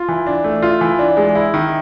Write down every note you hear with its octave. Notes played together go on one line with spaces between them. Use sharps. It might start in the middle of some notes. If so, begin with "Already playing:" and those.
Already playing: F4
E3
D4
A3
F4
E3
D4
G#3
E4
D#3